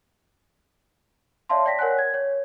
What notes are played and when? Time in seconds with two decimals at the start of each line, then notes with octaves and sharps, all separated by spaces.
1.49 C#5 D5 E5 F5 A5 C6
1.66 D5 G5 A#6 B6
1.79 A#4 C#5 F#5 G#5 F#6
1.98 G#6
2.14 C#5